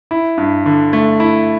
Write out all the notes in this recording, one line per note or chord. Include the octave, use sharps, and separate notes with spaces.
E4
G2
D3
A3
E4